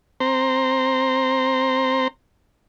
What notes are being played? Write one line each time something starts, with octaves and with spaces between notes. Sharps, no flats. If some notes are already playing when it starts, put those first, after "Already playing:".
C4 C5 A#5